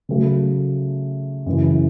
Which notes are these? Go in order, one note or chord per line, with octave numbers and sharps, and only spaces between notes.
C#3 F#3 A3
F#2 C#3 E3